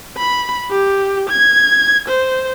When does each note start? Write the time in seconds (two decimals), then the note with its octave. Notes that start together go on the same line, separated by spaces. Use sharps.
0.17 B5
0.71 G4
1.29 G#6
2.08 C5